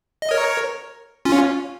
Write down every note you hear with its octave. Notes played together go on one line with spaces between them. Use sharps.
D#5
A#4 C#5
C#4 F4